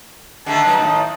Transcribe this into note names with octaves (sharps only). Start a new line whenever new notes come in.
D3 D#3 A3 A5
G2 F#3 D#4
A2 D#3